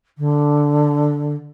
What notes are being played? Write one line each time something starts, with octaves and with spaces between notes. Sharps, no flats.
D3